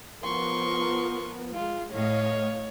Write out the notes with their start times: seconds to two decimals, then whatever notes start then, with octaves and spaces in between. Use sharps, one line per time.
0.24 F3 B3 A#4 C6 C#6
1.54 G#3 F4
1.93 A2 C#5 D#5 F5